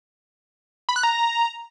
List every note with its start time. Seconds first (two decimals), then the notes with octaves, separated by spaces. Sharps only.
0.89 B5
0.96 F#6
1.03 A#5